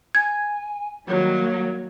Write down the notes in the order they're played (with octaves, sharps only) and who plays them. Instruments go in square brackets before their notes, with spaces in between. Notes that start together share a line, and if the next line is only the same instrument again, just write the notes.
[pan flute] G#5 [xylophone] G#6
[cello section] D#3 G3 A#3 [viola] F#3 [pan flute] C#5